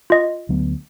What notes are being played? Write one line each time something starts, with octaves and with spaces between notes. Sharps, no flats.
F4 D#5
D2 F#3 B3